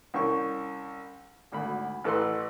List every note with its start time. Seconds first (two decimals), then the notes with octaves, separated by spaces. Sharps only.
0.14 C2 C#4 G5 C#6
1.52 G#1 D2 B5
2.04 A1 A4 B4 F#5 C6